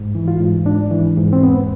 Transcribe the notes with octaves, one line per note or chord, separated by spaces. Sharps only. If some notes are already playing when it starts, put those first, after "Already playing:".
Already playing: G#2
E3
F4
G#2
G#2 D4
E3
G#2
C4
E2 B3